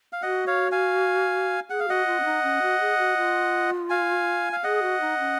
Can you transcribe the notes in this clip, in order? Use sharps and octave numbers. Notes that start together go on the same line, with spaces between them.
F5
F#4 D#5 F#5
C#5 F5
F5 G#5
G#4 F#5
F5
F#4 D#5 F#5
F4
C#4
D#4
C#4
F#4
G#4
F#4
F4
F5 G#5
F5
G#4 D#5 F#5
F#4
D#4
C#4